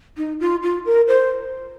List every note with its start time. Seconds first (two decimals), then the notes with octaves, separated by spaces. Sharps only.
0.17 D#4
0.40 F4
0.63 F4
0.86 A#4
1.08 C5